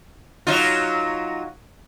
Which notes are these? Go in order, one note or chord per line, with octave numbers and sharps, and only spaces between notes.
F#3 D#4 F4